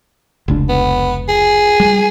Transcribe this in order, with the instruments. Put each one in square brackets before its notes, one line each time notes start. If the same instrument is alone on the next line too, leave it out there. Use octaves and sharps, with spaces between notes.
[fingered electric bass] F1 C#2 D4
[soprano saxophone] B3
G#4
[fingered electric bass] G3